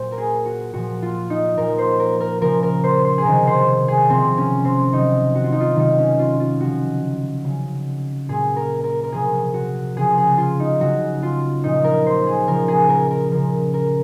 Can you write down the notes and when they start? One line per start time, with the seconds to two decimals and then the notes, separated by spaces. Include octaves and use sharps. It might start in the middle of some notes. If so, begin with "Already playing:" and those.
Already playing: A#2 F#3 C5
0.12 A#4
0.18 G#4
0.46 F#4
0.74 A#2 F3 F#4
1.02 F4
1.30 D#4
1.57 A#2 F3 A#4
1.78 C5
1.99 A#4
2.20 A#4
2.41 C#3 F3 A#4
2.63 A#4
2.84 C5
3.05 C5
3.18 G#4
3.25 C3 D#3 F#3 A#4
3.47 C5
3.88 G#4
4.09 C3 F3 C4
4.38 C#4
4.65 C4
4.92 C3 D#3 F#3 D#4
5.35 F#4
5.44 F4
5.52 D#4
5.60 F4
5.75 C3 D#3 F#3 D#4
5.99 C#4
6.19 F4
6.40 F4
6.61 C#3 F3 F#4
7.44 C#3 F#3
8.29 A#2 F#3 G#4
8.56 A#4
8.84 A#4
9.03 A#4
9.12 C3 F3 G#4
9.54 F#4
9.96 C#3 F3 G#4
10.17 G#4
10.38 F4
10.60 D#4
10.80 C#3 F#3 F#4
11.23 F4
11.64 A#2 F3 D#4
11.84 A#4
12.06 C5
12.27 G#4
12.47 C#3 F3 A#4
12.68 G#4
12.89 A#4
13.10 A#4
13.31 C#3 F3 A#4
13.74 A#4